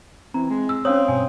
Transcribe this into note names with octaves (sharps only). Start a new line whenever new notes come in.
E3 C4 A#5
G#3
E6
C4 C#4 C#5 F5 D#6
G2 B2 G#5 D#6